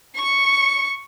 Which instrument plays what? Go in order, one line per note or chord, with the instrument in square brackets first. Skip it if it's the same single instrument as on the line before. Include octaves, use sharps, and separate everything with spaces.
[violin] C#6 C#7